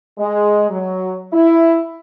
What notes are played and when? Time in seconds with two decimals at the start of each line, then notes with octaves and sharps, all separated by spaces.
0.19 G#3
0.70 F#3
1.33 E4